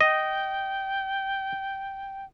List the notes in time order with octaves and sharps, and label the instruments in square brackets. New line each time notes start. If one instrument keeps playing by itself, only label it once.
[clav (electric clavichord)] D#5 [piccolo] G5